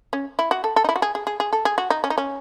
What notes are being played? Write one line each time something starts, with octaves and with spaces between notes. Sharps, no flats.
C#4
E4
F#4
A4
A4
D#4
E4
F#4
G#4
G#4
G#4
G#4
A4
G#4
F#4
D#4
C#4
D#4
C#4